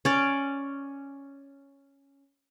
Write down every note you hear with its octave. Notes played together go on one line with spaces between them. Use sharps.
C#4 D5